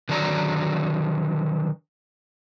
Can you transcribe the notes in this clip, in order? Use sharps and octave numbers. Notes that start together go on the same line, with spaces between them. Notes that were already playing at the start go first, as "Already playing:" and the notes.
D3 D#3 F#3 D5 F#5 A#5